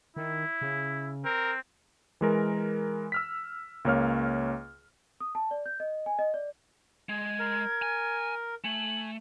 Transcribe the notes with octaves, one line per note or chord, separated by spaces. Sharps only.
D#3 E4
C#3
C4 A#4
E3 G#3 A#4
E6 F6 B6
C#2 A#3 C#5 F6
D#6
A5
D5
G6
D#5
G#5
D#5
D5
G#3 G#6
A#4
G#5
A3 G#5 F#7